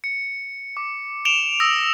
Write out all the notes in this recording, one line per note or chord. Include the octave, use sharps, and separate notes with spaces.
C#7
D6
D7 E7 F7 G7
D#6 E6 A#6 F7